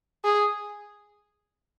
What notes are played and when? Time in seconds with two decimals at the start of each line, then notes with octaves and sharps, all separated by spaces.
0.24 G#4